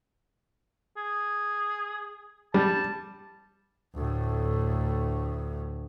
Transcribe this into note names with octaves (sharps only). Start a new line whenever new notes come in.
G#4
G3 A5
D2 A2